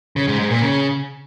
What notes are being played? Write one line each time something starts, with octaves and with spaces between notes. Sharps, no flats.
C#3
G#2
G#2
A#2
C#3